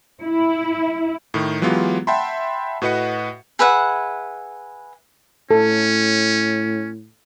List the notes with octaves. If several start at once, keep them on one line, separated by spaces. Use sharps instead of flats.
E4
A2 D#3
E3 F#3 G#3 B3 F4 G4
E5 F#5 G5 A5 B5 C6
A2 F#4 B4 D#5 F#5 C#7
G#4 B4 E5 F#5
A2 C#4 A4